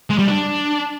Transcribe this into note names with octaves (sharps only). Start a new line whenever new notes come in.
G#3
G3
D4